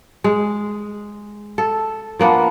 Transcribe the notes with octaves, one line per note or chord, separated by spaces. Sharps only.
G#3
A4
F3 A#3 B3 D4